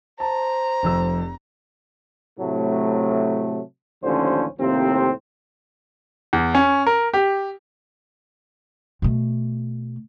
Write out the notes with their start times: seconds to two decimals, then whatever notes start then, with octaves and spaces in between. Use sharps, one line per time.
0.20 C5 A5 A#5
0.83 F1 F2 E6
2.39 A2 C3 F#3 A3
4.04 A1 D#2 D3 F3 C#4 C5
4.59 D#2 A2 C3 F3 C4
6.33 E2
6.55 C#4
6.87 A#4
7.14 G4
9.02 B2 A3